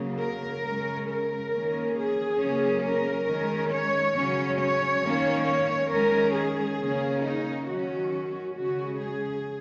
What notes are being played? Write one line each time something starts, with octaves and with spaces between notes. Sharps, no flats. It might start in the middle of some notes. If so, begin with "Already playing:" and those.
Already playing: C#3 F#3 A#3
A#4
C#3 G#3 C#4
A#4
D#3 A#3 C#4
G#4
C#3 F#3 A#3 C#4
A#4
D#3 G#3 C#4
C#5
C#3 F#3 C#4
C#5
D#3 A#3 C#4
C#5
D#3 G#3 C#4 A#4
G#4
C#3 A#3 C#4
D#4
D#3 F#3 C#4 F#4
C#3 G#3 C#4 F#4
G#4